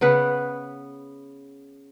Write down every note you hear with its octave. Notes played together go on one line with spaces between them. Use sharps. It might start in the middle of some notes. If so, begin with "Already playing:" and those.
C#3 B3 B4